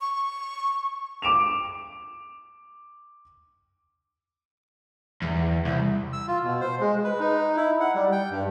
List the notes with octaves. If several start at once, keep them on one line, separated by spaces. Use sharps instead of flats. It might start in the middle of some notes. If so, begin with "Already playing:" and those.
C#6
D6 D7 E7 F7
E2
C2
E6
F4
B2
C5
G#3
B4
D#4
E4
F#5
G3
G5
G2